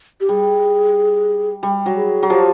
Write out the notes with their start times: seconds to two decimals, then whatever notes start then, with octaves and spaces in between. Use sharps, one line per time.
0.21 G4
0.29 G3 G#4
1.63 G3
1.86 F#3
1.96 G#4
2.23 F#3
2.29 F3 G4 G#4